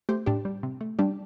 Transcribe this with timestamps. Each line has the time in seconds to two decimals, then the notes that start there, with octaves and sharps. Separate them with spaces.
0.09 A3 G4 C5
0.26 A2 D4 G4
0.45 G3
0.63 C3
0.81 A3
0.99 G3 D4 G4